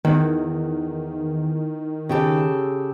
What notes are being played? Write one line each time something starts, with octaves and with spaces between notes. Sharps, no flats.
E2 D#3
C#3 G4 A4